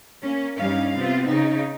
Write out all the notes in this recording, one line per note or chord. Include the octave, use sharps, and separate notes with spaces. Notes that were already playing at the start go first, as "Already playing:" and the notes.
A#3 C#4
G2 G3 C#4 D#4 F5
C3 B3 C4 F4
C#3 D#4